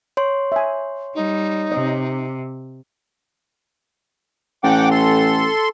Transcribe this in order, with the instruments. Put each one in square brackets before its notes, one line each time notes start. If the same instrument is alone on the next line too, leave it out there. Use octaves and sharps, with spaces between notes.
[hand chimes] C#5 C6
[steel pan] E5 G#5
[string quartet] G3 [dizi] D#4
[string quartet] C3 [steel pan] D#5
[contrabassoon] A1 [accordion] F#5 G5 D6
[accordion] A4 C6